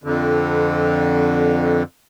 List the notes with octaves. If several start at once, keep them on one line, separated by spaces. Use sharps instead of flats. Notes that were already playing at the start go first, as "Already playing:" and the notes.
F2 D3